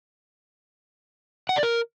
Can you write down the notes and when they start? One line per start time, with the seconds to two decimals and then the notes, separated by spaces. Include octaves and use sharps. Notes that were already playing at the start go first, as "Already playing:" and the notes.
1.49 F#5
1.56 D5
1.63 A#4